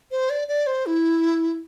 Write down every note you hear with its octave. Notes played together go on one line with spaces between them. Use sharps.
C5
D5
D5
C5
E4